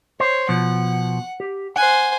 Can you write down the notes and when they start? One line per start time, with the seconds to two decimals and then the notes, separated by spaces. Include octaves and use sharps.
0.20 C5 C#5
0.49 B2 F3 F#5
1.40 G4
1.76 C5 F#5 G#5